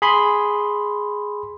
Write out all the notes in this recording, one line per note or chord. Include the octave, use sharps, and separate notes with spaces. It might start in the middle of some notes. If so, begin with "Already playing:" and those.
G#4 B5 C6